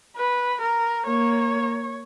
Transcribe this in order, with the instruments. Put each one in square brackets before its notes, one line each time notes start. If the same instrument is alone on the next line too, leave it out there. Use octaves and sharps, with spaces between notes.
[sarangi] B4
A#4
[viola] A#3 [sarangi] C#5